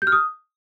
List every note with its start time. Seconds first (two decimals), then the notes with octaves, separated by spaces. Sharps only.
0.02 G6
0.07 F6
0.12 D#6